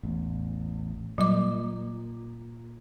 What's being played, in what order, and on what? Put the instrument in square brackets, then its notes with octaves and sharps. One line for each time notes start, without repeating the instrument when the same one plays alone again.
[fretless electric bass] A1 E2
[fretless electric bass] A#2 [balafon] F#3 G3 D6